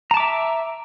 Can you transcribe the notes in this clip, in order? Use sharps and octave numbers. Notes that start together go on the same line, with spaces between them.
E5 A5 A#5 D6